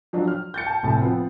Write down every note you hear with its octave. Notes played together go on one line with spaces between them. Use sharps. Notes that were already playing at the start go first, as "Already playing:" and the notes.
F3 F#3 D4
F6
G6 A6 C#7
A5
F1 A2 A5
F3 B3 C4